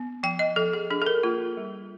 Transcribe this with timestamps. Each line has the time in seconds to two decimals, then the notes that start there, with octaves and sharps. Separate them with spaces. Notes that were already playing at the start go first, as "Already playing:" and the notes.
Already playing: B3
0.23 F3 G5
0.39 D#5
0.56 F3 A4
0.73 G#4
0.90 D4 G#4
1.02 A4
1.06 A#4
1.23 A#3 F4
1.57 G3